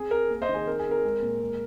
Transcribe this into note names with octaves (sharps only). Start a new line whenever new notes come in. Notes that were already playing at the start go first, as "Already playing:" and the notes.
Already playing: C4 G#4
C4 A#4
A#3
C5 D#5
D#3
G#4 C5
C4 A#4
G#4
C4
A#4
G#3
A#2
G#3